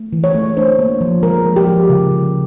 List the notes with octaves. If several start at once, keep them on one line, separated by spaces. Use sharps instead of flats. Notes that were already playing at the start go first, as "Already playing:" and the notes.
Already playing: A3
E3
C#5
A3
D4 C5
A#3
F3
G#3 A#4
F3
G4
F3
C#3
C#3